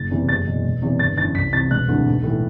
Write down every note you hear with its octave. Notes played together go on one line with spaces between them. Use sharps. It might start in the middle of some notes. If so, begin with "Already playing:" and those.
Already playing: F#1 A6
E2 C3 E3
F#1 A6
E2 B2
E1
E2 C3 E3
G1 A6
F#2 E3 A6
C2 B6
C3 E3 A6
E1 F#6
D2 C3 E3
B1
A2 E3